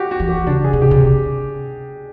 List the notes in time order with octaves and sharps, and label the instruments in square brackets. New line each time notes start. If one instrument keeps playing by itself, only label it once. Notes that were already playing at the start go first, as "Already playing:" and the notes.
Already playing: [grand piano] F#4 G4
F#4
[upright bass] E3
[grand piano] G4
[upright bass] C#3 [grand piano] D4
[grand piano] G#4
[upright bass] C3
[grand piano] G4
[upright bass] C3